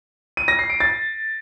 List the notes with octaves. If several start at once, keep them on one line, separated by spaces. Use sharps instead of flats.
D#7
A#6
C7
D7
A6